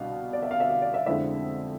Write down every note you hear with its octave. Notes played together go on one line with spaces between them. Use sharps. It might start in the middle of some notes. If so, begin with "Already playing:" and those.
Already playing: C2 B2 D4 F5
D5
E5
F5
E5
F5
D5
E5
F2 D3 G#3 C4 E4 E5